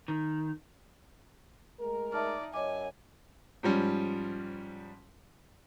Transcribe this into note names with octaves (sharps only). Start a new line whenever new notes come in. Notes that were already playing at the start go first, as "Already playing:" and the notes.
D#3
G#3 A3 A#4
D#4 D5 E5 A5 F6
F#2 C#5 D#5 G#5 D6
G#2 F3 G3 C#4